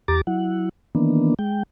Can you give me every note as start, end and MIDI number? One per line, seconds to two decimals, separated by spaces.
0.08 0.21 40
0.08 0.21 67
0.08 0.21 82
0.08 0.21 86
0.08 0.21 93
0.27 0.69 54
0.27 0.69 64
0.27 0.69 78
0.95 1.34 51
0.95 1.34 52
0.95 1.34 58
0.95 1.34 59
0.95 1.34 62
1.39 1.63 56
1.39 1.63 79